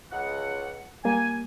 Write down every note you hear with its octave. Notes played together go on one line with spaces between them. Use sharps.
C#2 F#5
G3 A#3 G#5